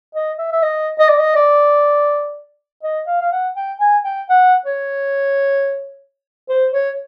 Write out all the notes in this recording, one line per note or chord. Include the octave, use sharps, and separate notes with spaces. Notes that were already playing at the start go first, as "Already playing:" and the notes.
D#5
E5
E5
D#5
D#5
D5
D#5
D5
D#5
F5
F5
F#5
G5
G#5
G5
F#5
C#5
C5
C#5